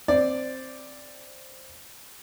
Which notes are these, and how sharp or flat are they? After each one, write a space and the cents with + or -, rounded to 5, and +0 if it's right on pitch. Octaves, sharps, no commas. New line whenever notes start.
C4 +0 D5 +0